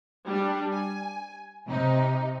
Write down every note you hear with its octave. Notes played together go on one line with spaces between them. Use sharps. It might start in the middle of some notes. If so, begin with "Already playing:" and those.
G3 D4
G#5
C3 D#4